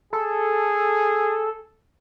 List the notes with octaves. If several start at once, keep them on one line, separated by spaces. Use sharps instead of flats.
G#4 A4